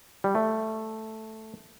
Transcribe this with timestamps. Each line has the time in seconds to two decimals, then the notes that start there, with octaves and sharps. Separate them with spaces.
0.24 G3
0.35 A3